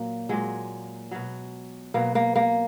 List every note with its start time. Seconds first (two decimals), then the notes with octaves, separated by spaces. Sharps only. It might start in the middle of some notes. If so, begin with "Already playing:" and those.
Already playing: A#2 F#3 A#3
0.29 A#2 F#3 G#3
1.11 B2 F#3
1.94 B2 F#3 A#3
2.15 A#3
2.36 A#3